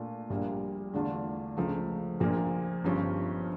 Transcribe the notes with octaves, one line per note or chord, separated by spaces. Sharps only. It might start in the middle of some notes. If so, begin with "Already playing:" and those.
Already playing: A#2 A3 D4 F4
A#1 A#2 G3 A#3
E2 D3 A3 D4 F4
C#2 C#3 F3 A3
A#1 A#2 F3 A#3
G1 G2 F3 C#4